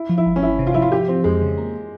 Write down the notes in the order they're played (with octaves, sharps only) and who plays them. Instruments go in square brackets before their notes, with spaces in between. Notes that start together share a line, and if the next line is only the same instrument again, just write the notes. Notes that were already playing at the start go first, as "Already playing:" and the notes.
Already playing: [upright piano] E4
[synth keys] F3
[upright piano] E4
[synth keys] G1
[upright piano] C#4
[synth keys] G1 [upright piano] E4
[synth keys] C3
[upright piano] F4
[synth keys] F3 [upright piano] E4
[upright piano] F4
[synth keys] F3 [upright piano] G4
[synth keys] F3 [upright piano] C4
[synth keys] F2 [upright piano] G#3
[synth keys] C#3
A#3